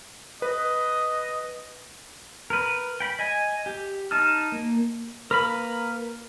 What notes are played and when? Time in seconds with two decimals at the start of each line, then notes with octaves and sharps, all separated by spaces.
0.42 B4 D#5
2.50 A#4 B4
3.00 G5 B5
3.19 D#5 G#5
3.66 G4
4.11 D#4 A5 D#6 F6
4.52 A#3
5.31 A#3 A#4 B4 B5